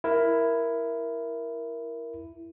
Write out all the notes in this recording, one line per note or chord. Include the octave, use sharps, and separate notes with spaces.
E4 A#4